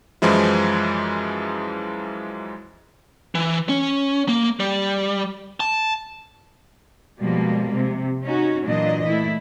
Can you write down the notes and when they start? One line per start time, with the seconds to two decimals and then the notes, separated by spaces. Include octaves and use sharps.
0.22 F#2 E3 F3 G#3 E4
3.35 E3
3.69 C#4
4.29 A#3
4.60 G3
5.60 A5
7.21 B2 F3 G3 G#3 A#3
7.73 C3
8.25 C#4 D#4 F#4
8.66 A#2 E3 F#3 D4 D#5
9.06 A3 E4